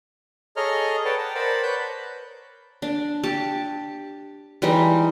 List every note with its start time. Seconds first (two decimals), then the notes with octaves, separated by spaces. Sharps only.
0.57 G#4 A4 C#5 D#5 A#5 F6
1.05 B4 C#5 D5 F#5 G5 A5
1.19 F#5 G5 A5 A#5
1.35 A#4 C5 D5 F#5 A5 B5
1.63 B4 C#5 B5 F#6 G6
2.82 D4
3.23 G4 A5
4.62 E3 G3 G#3 D#4